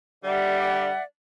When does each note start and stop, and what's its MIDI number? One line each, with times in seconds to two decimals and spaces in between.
0.24 0.92 50
0.24 0.92 55
0.24 1.02 74
0.24 1.02 76
0.24 1.02 78